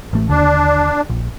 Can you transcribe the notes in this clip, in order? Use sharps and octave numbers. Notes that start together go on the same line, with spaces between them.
A1 A3
D#2 D3 D4
A#1